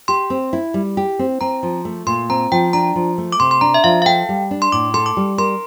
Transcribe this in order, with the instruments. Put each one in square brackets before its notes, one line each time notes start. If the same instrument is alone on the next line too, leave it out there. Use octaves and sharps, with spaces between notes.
[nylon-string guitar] G4 [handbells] C6
[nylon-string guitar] C4
E4
G3
G4
C4
[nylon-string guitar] C4 [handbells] A#5
[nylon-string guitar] F3
A3
[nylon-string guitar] A#2 [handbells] C6
[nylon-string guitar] C4 [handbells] A#5
[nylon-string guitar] F3 [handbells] G5
[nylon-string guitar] D4 [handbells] A#5
[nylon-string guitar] F3
A3
[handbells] D6
[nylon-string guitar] C3 [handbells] C6
[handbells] C6
[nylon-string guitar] D4 [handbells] A#5
[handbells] E5
[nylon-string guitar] F3 [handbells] F5
[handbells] F5
[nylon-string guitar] A4 [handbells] G5
[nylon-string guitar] G3
D4
[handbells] C6
[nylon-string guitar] A2 [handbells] D6
[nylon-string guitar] A4 [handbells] C6
[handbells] D6
[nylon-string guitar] G3
[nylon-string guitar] A#4 [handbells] C6